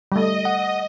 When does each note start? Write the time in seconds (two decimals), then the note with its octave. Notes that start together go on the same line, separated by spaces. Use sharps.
0.12 G3 A3 D#5
0.45 F#5